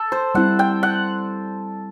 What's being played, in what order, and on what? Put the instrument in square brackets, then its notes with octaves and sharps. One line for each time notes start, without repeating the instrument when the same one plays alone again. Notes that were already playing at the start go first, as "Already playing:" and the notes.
Already playing: [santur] A4
C5
[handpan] G3 C4 E4 [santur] F#5
[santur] G5
F#5